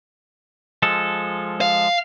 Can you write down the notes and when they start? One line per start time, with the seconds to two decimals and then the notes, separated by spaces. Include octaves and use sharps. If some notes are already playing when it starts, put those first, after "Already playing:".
0.82 F3 G#3 A4
1.61 F5